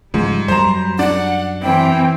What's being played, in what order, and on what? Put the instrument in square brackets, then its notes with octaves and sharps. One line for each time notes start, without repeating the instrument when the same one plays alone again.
[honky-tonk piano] G#2 [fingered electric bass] C#3 F3 [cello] G3
[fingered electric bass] F#2 F#3 [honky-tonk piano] C5 A#5
[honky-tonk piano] D4 [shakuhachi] F#5
[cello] E3 C4 [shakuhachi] G5